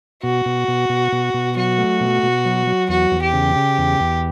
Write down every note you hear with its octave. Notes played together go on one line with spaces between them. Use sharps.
B2 F#4
B2
B2
B2
B2
B2
F#3 F#4
A3
B2
B2
F#3
F#3
E2 F#4
E2
G4
C#3
C#3
E2
E2